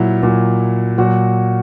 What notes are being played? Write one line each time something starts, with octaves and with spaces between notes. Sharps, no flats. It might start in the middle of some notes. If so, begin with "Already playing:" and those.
Already playing: A#2 F#3 E4
A#2 F#3
A#2 F#3 F#4